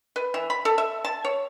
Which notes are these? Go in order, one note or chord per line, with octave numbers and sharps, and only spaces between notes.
B4
E3
B5
A4
E5
A5
C#5